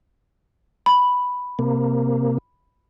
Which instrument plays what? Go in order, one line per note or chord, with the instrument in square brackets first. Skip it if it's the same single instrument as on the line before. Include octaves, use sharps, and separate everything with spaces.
[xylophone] B5
[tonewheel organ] C3 A#3